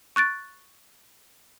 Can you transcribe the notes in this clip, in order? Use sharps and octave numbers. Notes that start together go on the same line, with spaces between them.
C#6 F#6 A6 D7